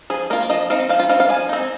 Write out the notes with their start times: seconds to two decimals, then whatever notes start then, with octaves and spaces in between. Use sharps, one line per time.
0.10 F3 G#4
0.30 A#3 F4 A#4
0.50 F3 D#5
0.70 C4 D#4 F5
0.89 F3 F5
0.99 F4
1.09 C4 D#4 F5
1.20 F5
1.29 F3 G#5
1.49 C4 D#4